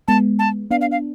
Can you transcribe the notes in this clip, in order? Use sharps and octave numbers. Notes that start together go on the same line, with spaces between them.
G#3 B3 A5
A5
B3 D4 F5
F5
F5